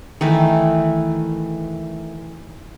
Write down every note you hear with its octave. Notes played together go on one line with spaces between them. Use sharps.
D#3 E3 A3